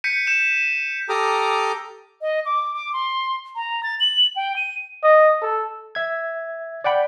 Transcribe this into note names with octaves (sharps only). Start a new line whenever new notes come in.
G6 B6 C#7 D#7
G6 E7
E7
G4 A4 A#5 D6 D#6 F6
D#5
D6
D6
C6
A#5
A6
F#7
G5
D#7
D#5
A4
E5 G#6
D5 F#5 G5 B5